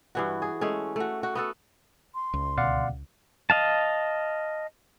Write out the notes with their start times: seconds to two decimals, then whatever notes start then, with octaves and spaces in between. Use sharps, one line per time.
0.15 G2 E3 F#4
0.42 G#4
0.61 G#3 A3 C#4
0.96 A3 F#4
1.23 F#4
1.35 B3 F#4 A4
2.15 C6
2.33 C#2
2.58 D2 B2 D5 F5 F#5
3.50 D#5 F5 A5